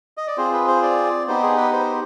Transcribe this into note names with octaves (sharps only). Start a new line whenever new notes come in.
D#5
D5
C4 F4 G#4 C5
B4
C5
D5
B3 D#4 G4 C5
G#4
B4
C5